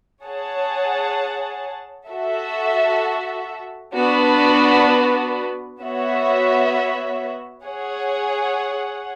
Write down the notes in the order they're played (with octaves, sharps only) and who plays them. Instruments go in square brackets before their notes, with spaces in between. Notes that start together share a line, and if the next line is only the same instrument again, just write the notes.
[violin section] G#4 C#5 F#5 A5
F#4 A4 E5
B3 D4 F#4 B4
B3 F#4 C#5 E5
G#4 C#5 F#5